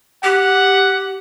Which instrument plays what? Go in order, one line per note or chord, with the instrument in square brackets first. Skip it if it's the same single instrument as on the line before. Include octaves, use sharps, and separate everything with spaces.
[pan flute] G4 [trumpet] F#5